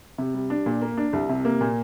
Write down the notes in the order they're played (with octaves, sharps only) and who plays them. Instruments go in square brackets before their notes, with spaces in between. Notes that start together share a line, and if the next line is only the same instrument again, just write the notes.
[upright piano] C3
G3
D4
A#2
A#3
D4
C2
C3
A#3
A#2